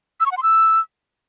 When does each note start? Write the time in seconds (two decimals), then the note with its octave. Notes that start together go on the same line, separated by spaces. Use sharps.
0.20 E6
0.26 C#6
0.32 F#5
0.37 C6
0.43 E6